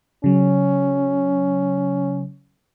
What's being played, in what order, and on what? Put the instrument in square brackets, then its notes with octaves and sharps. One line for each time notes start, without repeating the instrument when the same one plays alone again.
[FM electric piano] C#3 F#3 [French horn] C#4